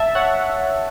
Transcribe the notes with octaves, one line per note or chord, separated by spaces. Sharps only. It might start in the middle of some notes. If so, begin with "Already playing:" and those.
Already playing: E5 A5
C#5 F#5